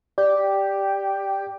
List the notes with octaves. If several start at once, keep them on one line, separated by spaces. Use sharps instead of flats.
G4 D5